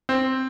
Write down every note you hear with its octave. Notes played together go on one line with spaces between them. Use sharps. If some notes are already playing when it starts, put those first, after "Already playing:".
C4